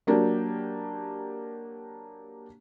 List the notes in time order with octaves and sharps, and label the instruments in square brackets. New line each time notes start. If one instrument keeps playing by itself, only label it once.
[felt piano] F#3 A#3 D4 G4